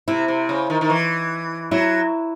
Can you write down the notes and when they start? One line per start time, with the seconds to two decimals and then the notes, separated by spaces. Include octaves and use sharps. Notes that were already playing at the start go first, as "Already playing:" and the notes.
0.08 C3 E4
0.28 C3
0.49 C#3
0.70 D#3
0.81 D#3
0.90 E3
1.71 F#3 E4